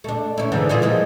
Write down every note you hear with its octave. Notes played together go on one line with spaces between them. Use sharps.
A3 D4
C#4 E4
G#2 D3 E3
E3 F4 G#4
F3 G#3 A#3